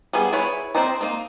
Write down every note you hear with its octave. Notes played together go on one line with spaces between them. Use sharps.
G3 B3 G#4
E4 G#4 B4 C#5
C4 D4 C5 D#5 A#5
A#3 D#4